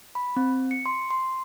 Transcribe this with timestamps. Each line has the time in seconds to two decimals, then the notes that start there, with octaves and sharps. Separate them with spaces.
0.15 B5
0.36 C4
0.71 C#7
0.86 C6
1.11 C6